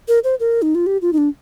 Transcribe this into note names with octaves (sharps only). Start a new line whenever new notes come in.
A#4
C5
A#4
D#4
F4
G4
F4
D#4
D4